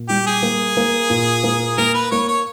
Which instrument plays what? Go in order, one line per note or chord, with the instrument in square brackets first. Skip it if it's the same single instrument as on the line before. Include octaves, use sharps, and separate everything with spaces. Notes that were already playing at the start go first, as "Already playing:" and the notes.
Already playing: [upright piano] A#2
[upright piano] G3 [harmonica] G4
[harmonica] G#4
[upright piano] A#3
A#3
A#2
A#3
[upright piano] A#3 [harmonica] A#4
[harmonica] B4
[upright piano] A#3 [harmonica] C#5
[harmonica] C#5